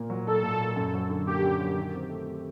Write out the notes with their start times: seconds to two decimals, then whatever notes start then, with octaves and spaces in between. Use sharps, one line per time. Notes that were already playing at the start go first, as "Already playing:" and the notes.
Already playing: A#2 A#3
0.10 F#3
0.27 D#4 A4
0.44 A#2
0.60 A#3
0.76 F#2
0.94 F#3
1.10 D3
1.27 A#3 G4
1.43 F#2
1.60 F#3
1.76 D#3
1.94 C4
2.09 A3
2.26 G4